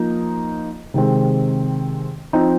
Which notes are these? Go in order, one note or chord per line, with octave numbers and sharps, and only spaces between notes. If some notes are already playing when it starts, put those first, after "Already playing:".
Already playing: F3 A#3 D#4
C3 D#3 G#3 C4
F3 C4 D#4